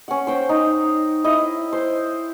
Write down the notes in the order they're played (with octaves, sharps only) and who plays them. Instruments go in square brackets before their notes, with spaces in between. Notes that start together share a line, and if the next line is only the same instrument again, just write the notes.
[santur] C#4 F#5
C5 G5 C#6
D#4
E4 D#5
C5